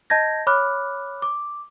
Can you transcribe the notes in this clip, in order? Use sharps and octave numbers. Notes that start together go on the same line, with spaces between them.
D#5 A5 G6 G#6 A#6
C#5 B5 D6 F6 F#6
D6